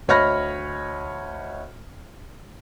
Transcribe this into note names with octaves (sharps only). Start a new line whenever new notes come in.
D2 C#5 D#5 B5 F6 A#6